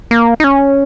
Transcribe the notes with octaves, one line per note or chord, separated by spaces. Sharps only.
A#3
D#4
C#4